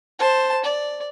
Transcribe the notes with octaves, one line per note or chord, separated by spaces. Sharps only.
C5 A5
D5